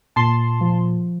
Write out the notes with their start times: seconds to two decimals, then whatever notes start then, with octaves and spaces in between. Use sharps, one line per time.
0.16 A#2 A5 C6
0.61 F3